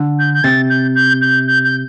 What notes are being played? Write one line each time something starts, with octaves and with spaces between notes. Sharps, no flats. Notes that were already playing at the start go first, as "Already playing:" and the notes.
Already playing: D3
G6
G6
C3 A6
G6
G6
G6
G6
G6